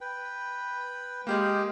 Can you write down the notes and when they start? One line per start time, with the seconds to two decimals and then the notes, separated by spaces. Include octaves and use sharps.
0.01 B4 G5
1.27 G#3 A#3 G4 G#4 F5 G5